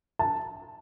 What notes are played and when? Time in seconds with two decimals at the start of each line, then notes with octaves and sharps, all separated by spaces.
0.19 A5